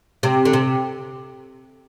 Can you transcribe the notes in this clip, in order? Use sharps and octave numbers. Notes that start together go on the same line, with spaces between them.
C3
D3
C3